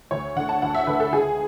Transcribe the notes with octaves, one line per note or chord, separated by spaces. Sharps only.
D2 C#5
D3 A3 F#5
A5
D2 F#5
E5
D3 A3 B4
A4
C#2 G#4